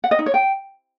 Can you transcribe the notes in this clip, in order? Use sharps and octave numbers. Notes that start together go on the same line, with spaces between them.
F#5
D#5
D#4
C#5
G5